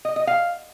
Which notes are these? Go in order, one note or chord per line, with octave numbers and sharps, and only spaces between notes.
D#5
D#5
F5